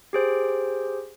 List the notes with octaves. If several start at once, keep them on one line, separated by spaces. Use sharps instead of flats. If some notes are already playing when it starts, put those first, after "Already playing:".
G4 G#4 C5